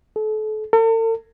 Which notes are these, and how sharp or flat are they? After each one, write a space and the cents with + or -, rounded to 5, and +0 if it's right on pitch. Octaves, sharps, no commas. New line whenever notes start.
A4 -35
A4 +45